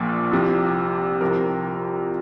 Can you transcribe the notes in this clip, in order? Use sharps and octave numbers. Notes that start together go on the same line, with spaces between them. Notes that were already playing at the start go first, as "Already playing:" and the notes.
Already playing: A#1 A#2 F3
C2 C3 F3
C2 C3 F3 A#4